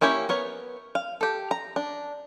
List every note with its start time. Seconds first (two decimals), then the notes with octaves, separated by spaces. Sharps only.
0.01 A#3 C#4 E4 G4 C#5
0.29 B3 A#4 C#5
0.95 F5
1.21 G4 A4
1.51 A#5
1.76 D4